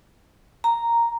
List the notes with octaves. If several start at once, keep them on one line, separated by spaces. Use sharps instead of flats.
A#5